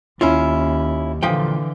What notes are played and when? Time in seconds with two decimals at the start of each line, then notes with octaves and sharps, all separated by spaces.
0.21 D#2 C#4 E4 F4
1.23 A#2 D3 E3 F3 G5